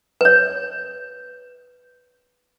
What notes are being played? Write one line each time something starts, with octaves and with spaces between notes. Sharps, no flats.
B4 C#5